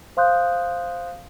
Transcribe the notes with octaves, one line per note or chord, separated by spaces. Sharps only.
C5 F5 C6 D#6 F#6 G6